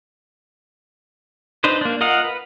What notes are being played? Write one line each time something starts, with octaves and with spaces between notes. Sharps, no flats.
D4 D#4 B4 C5
A#3 D4
F4 A#4 D#5 F5 F#5
B4